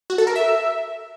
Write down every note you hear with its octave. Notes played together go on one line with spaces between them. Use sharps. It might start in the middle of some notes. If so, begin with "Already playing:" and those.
F#4
A4
A#4
E5